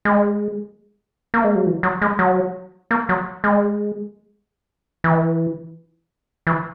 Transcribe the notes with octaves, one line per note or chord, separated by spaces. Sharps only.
G#3
A#3
G#3
F#3
E3
F#3
G#3
F#3
A#3
F#3
G#3
E3
E3